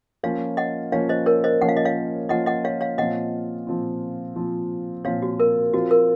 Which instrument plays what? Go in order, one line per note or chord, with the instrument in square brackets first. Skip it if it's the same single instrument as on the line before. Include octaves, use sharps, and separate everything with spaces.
[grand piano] F3 A#3 C#4 F4 [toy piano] C#5 F5
[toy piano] D#5 F#5
[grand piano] F3 A#3 C#4 F4 [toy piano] C#5 F5
[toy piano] C5 D#5
A#4 C#5
C5 D#5
[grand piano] F3 A#3 C#4 F4 [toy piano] F#5
[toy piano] F5
D#5
C#5 F5
[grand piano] F3 A#3 C#4 F4 [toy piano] D#5 F#5
[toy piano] D#5 F#5
C#5 F5
C#5 F5
[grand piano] A#2 F3 C4 F4 [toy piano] D#5 F#5
[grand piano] A#2 F3 C4 F4
A#2 F3 C4 F4
[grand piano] A#2 F3 C4 F4 [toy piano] C#5 F5
[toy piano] F#4
A#4
[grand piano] F3 C4 F4 [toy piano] F#4
[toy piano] A#4